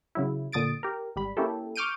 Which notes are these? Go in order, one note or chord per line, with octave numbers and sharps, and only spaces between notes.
C#3 F#3 E4
A#2 D3 D#6 A6 D7
G4 A#4
G#1 G3 B5
A#3 C#4 E4 G4 A4
C#6 D6 F6 G6 D7 D#7